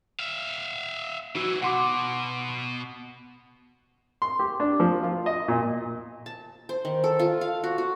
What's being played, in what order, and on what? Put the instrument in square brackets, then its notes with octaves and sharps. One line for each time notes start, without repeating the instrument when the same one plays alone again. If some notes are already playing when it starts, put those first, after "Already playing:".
[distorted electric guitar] E5 F5
[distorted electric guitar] E3 F#3 [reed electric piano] D#4 F#4 E6
[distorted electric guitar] B2 [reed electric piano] F#5 C6 D6
[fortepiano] C6
G4
D4
F3
F4
D#5
A#2
[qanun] A5
C5
D#3
A4
F4
F5
F#4
F#4